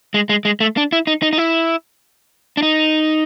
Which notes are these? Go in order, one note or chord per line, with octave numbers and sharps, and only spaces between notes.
G#3
G#3
G#3
A3
D4
E4
D#4
D#4
D#4
E4
D4
D#4